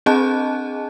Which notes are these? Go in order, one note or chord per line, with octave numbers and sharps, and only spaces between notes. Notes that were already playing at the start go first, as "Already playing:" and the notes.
C4 D4 G#4 D#5 A5 F#6